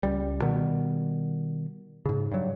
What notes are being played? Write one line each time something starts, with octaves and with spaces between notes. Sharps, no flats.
C#2 G3
B2 D#3 G3 B3
G#2 C#3
G2 F#3